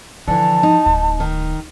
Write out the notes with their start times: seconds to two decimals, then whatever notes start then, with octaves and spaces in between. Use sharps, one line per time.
0.27 D3 E3 F3 A5
0.63 D#4
0.86 D1
1.20 D#3